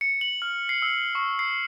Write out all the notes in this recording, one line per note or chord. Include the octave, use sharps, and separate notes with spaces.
C#7
F#7
F6
C7
E6
C#6
C7